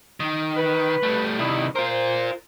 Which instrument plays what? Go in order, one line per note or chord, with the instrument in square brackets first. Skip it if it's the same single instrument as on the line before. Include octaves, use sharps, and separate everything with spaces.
[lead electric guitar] D#3
[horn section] B4
[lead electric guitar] G3 A3
[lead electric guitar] C3 D#3 [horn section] G3 D#4 E4
[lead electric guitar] F4 A#4 [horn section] C5